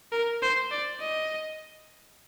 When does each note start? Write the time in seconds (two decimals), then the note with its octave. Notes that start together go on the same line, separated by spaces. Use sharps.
0.12 A#4
0.42 C5
0.71 D5
1.00 D#5